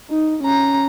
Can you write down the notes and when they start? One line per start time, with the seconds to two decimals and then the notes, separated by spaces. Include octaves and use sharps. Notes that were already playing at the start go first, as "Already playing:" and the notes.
0.10 D#4
0.43 C#4 A#5